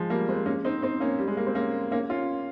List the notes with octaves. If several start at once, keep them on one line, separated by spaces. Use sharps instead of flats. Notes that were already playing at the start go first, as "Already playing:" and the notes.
Already playing: F3 G#3
G3 A#3
G#3 C4
A#3 C#4
C4 D#4
C4 D#4
A#3 C#4
G3
G#3
A#3
C4
A#3 C#4
A#3 C#4
C#4 F4